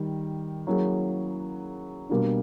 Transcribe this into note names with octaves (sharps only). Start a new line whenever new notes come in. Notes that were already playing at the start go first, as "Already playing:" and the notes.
Already playing: D#3 G3
F#3 A#3 C#4 E4 G#4
B2 G3 A#3 D4